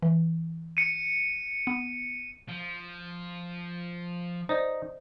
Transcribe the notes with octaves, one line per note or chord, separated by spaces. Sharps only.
E3
C#7 D#7
B3
F3 G7
D#4 C5 D5 D#5